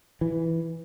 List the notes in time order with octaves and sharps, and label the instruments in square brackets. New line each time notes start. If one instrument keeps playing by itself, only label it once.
[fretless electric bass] E3